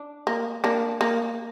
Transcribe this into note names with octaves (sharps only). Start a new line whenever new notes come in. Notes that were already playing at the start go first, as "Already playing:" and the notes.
Already playing: D4
A#3
A#3 D4
A#3